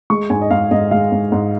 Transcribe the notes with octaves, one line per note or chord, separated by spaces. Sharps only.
G#3 C#6
G#2 G#5
D#5
G#2 F5
G#2 D#5
G#3 F5
G#2
G#2